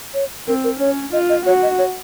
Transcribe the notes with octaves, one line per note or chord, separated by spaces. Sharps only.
C#5
C4 A#4
A#4
C#4 C#5
F4 D#5
D#5
F#4 C#5
D#5
C#5